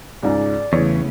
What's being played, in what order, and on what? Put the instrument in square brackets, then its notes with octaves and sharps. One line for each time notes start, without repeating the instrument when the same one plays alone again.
[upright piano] C#2 G#2 [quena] D5
[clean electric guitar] E2 [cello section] C#3 A3 B3 [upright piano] E3 C#5